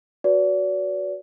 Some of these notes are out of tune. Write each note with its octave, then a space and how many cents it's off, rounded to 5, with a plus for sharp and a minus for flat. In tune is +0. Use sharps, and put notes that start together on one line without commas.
F#4 +0 B4 +0 D5 -40